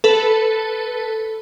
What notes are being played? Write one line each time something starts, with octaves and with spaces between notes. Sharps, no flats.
A4 B4